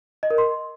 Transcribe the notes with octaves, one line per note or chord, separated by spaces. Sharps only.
D#5
A#4
C6